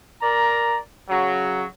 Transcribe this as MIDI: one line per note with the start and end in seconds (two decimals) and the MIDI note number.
0.21 0.77 70
0.21 0.77 74
0.21 0.77 82
1.08 1.63 49
1.08 1.63 54